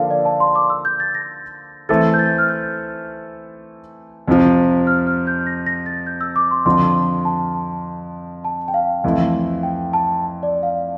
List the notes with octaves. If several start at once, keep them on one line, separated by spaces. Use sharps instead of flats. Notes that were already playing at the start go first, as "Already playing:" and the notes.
Already playing: D3 F3 A#3 D4 A4 D5 F5
D5
A5
C6
D6
E6
G6
A6
A#6
E3 A3 C4 E4 A4 A6
G6
A6
F6
G6
F2 C3 F3
F6
F6
G6
A#6
A#6
A6
G6
E6
D6
C6
F2 D3 F3 C6
A5
A5
G5
F5
F2 E3 A3 E4
G5
A5
D5
F5